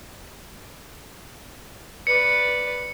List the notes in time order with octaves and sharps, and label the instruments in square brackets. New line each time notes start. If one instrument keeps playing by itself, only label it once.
[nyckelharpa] B4 D5 [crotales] C#7